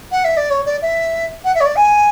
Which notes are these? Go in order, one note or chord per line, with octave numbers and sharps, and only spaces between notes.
F#5
E5
D5
C#5
D5
E5
F#5
E5
C#5
D5
G#5